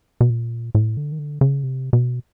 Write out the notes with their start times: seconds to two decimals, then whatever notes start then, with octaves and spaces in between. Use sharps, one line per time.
0.20 B2
0.30 A#2
0.75 A2
0.97 D3
1.12 D#3
1.19 D3
1.41 C#3
1.63 C3
1.93 B2